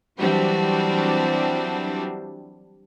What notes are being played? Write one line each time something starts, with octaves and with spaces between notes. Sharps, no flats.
E3 F#3 G3 C4 D4 F#4